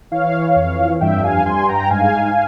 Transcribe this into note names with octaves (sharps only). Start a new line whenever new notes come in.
E3 C#5 F5
F2
G2 E5 G5
F5 G#5
G2 G#5 C6
G5 A#5
G#2 F5 G#5